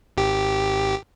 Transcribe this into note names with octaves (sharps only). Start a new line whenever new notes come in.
G#1 G4